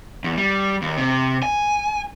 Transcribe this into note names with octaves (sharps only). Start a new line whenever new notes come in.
E2
G3
D#2
C3
G#5